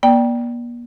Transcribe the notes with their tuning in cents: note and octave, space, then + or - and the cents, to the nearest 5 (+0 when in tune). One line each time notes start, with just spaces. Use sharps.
A#3 +45 D5 +0 G5 +0